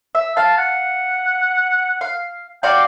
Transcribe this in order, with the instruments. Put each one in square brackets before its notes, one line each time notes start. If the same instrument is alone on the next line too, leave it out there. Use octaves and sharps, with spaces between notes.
[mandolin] E5
[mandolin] F5 [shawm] A5
[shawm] F#5
[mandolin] F5
[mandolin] F#4 D5 F5 [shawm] G5